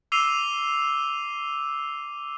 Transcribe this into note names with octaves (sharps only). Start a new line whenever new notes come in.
D6 E6 C7 D#7 F7 G7